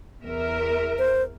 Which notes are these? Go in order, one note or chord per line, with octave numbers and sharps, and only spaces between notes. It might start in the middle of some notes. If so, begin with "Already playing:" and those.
E2 A#4 E5
C5